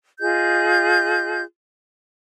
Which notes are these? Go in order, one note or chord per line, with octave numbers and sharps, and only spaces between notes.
F4 G#4 D#5 G6